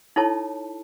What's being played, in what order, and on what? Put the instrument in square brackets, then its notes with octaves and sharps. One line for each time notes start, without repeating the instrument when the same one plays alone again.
[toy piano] D#4 E4 A4 C#5 A5